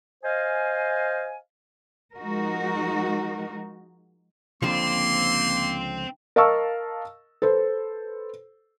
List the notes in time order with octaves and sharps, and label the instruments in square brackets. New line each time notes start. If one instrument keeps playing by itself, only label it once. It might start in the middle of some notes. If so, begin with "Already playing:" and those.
[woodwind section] C5 D#5 F5 G#5
[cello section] F3 G#3 D#4 F#4 A#4
[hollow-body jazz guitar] C#2 D3 F3 [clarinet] A#3 [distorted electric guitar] C4 [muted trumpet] C6
[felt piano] A#4 D#5 F5 A5 C#6 E6
A4 B4 C5